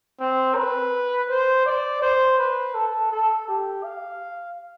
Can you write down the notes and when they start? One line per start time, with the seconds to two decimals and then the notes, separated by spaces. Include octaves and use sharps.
0.20 C4
0.56 B4
1.29 C5
1.66 D5
2.02 C5
2.39 B4
2.74 A4
3.11 A4
3.48 G4
3.84 F5